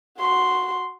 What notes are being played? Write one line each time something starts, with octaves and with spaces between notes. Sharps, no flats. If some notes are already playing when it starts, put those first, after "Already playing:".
F#4 C6